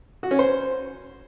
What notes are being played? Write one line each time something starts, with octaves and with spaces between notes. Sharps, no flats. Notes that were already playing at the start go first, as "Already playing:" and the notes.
F#4
C#4
C5